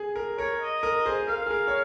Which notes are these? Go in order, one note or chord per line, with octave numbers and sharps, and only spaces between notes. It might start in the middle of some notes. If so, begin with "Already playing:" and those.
Already playing: G#4
A#4
A#4 C#5
D#5
A#4
G#4 C5
A#4 F5
G#4
A#4
C#5